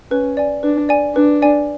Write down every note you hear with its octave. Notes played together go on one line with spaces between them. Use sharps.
C#4 B4
D5 G#5
D4 B4
D5 G#5
D4 B4
D5 G#5